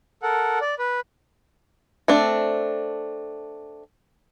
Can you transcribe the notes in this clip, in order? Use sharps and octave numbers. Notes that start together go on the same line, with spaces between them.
A4 A#4 F#5
D5
B4
A3 C4 D4